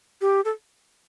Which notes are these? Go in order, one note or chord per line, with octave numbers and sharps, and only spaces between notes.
G4
A4